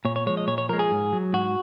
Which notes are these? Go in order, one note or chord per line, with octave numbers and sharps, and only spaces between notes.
A#2 C#5
C#5
F3 G#3 C#5
D#5
A#2 C#5
C#5
F3 G#3 A#4
G#4
G#2
F#3
G#2 F#4